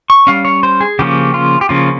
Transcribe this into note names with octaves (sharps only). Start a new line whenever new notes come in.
C#6
G3 C#4 F5
C#5
C5
G#4
C#3 F3 A#3 C#4 G4
F4
G4
C#3 F3 A#3 C#4 F4